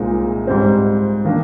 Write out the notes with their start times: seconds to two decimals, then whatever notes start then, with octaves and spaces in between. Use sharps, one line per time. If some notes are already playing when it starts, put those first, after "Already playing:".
Already playing: C2 A#2 G#3 C4 D#4
0.47 G#2 G3 C4
1.24 D#3 A#3 D4